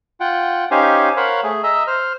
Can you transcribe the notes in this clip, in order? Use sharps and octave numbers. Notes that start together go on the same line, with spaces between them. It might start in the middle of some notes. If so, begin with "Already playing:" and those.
F4 F#5 G5
C#4 D#4 G4 C5 F5 G#5
A#4 C5 C#5 F5 F#5 B5
A3 G#4
D#5 E5 A#5 E6
C5 F6